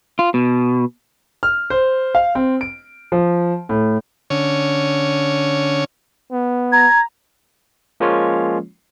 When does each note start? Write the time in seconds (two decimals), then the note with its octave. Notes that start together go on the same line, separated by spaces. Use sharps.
0.19 F4
0.34 B2
1.43 F6
1.70 C5
2.15 F5
2.35 C4
2.61 D7
3.12 F3
3.69 A2
4.30 D3 C#4 C#5
6.32 B3
6.72 A#5 G#6
8.00 F3 G#3 A#3 C#4 F4 C#5